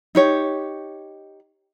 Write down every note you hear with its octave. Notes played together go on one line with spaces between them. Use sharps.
D#4 G4 C#5